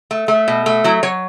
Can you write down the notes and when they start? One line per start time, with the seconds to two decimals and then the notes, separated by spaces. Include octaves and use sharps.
0.11 A3
0.28 A3
0.48 B2
0.66 A3
0.84 F#3 E4
1.03 F#3 C#5